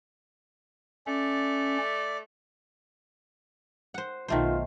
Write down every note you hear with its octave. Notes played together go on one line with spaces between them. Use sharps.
A3 C#4 D5
C5 F#5
B1 D#3 A3 F4 C5